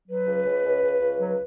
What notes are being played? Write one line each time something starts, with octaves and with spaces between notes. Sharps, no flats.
F#3 B4
C#2
C#2
C#2
C#2
C#2
F#3